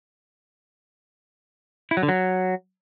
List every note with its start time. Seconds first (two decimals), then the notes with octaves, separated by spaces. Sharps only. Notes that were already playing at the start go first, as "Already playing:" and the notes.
1.91 E4
1.97 F#3
2.03 D3
2.09 F#3